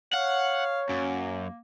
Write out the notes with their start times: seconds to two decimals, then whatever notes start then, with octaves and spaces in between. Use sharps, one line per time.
0.14 C#5 F5 F#5
0.89 F#2 A#3